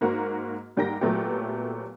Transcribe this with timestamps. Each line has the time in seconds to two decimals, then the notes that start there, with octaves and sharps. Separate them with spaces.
0.01 G#2 A#3 F#4 C5 A#5
0.77 G#2 G3 A#3 G5 A#5 A#6
1.01 A#2 F#3 A3 B3 G4